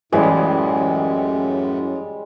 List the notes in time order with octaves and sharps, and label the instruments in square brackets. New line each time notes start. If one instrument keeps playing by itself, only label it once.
[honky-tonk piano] A1 E3 [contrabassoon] F#2 [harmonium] A2 [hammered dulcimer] G3 G#3